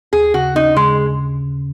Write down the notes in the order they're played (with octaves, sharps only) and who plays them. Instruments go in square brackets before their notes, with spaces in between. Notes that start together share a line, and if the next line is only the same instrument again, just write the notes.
[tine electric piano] D#2 [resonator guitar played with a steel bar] G#4
[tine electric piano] C#3 [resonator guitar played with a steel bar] F#4
[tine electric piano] C#4 [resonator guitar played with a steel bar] D#4
[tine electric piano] C#3 [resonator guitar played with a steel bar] G#3